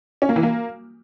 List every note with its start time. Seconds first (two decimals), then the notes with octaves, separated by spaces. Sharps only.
0.22 C#4
0.29 A#3
0.36 E3
0.43 A#3